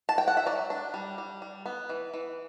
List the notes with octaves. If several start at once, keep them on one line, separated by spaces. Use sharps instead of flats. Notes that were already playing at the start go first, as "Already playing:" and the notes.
A5
G5
F#5
E5
F#3 D5
D4
G3
G3
G3
B3
E3
E3